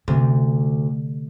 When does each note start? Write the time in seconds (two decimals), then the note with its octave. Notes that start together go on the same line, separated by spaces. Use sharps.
0.08 D2 C3